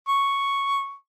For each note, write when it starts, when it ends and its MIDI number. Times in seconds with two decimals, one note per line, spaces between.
0.08 0.94 85